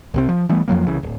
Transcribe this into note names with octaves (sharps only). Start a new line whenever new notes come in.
C2 C3 C4
F3
E3 G3 A3 B3
F2 F3 F#3 A#3
C2 C#3 E3
D1